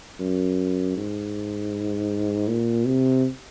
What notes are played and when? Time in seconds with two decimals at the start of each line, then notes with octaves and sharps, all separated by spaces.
0.20 F#2
0.97 G#2
2.48 A#2
2.86 C3